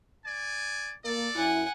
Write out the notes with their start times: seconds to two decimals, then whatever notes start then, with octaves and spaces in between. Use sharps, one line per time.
0.24 D5 G#5
1.04 A#3 A4 D5
1.36 F#2 E4 F#5 G#5